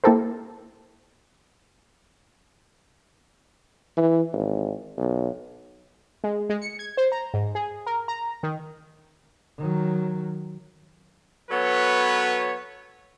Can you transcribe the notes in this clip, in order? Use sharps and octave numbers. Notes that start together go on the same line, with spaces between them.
A#3 E4 G4 A4 A#4 C5
E3
G#1
B1
G#3
G#3
C#7
G#6
C5
A#5
G#2
G#4
A#4
A#5
D#3
D#3 F#3
F#3 B3 A4 B4 C#5